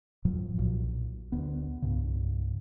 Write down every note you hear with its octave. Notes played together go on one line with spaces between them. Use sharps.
F2 A2 F3 F#3
B1 A#2
D2 B3
C2 G2 C#3